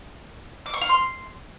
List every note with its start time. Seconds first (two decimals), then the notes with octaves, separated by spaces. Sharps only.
0.66 D6
0.74 C#6
0.81 F5
0.89 C6